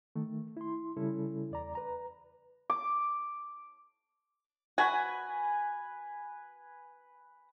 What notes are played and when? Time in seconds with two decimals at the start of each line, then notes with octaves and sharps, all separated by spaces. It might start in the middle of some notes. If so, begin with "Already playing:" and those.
0.16 D#3 A3
0.57 E4 C6
0.97 C#3 G3 C#4 E4 A4
1.51 E2 D5 A#5
1.75 B4 A#5
2.70 D6
4.78 F#4 B4 G#5